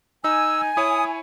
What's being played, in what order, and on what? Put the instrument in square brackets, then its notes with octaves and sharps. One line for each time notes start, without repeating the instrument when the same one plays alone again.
[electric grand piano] D#4 [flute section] G#5 [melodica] E6
[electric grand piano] E4 C#5 [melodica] D#6